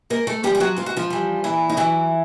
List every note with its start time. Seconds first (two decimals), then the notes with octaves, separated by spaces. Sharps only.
0.10 G#2 A#3 A#4
0.27 A3 A4
0.43 G3 G#3 G4
0.47 F3
0.55 G4
0.60 F#3 F#4
0.76 G#2 F4
0.86 F#4
0.97 F3 F4
1.10 E3 G3
1.44 A#2 E3 E4
1.70 D#4
1.77 E3 F#3 E4